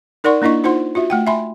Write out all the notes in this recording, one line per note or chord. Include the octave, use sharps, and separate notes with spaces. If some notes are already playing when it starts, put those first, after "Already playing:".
D#4 A#4 D5 F#5 C6 C#6
A#3 D4 E4 D#5 C#6
D#4 F4 C5 F#5 C6
F4 F#4 E5
A3 F#5 G5
E5 G#5 B5 C6